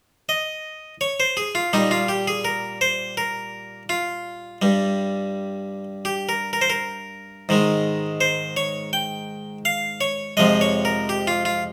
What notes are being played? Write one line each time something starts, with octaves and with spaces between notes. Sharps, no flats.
D#5
C#5
C5
G#4
F4
A#2 G3 D#4
F4
G4
G#4
A#4
C5
A#4
F4
G2 G3
G4
A#4
A#4
C5
A#4
G#2 D#3 G#3
C5
C#5
G5
F5
C#5
F2 C3 F3 G#3 D#5
C#5
A#4
G4
F4
F4